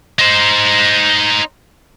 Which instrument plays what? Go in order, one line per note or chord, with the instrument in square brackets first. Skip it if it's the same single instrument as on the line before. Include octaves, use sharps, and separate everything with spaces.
[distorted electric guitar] D#4 C5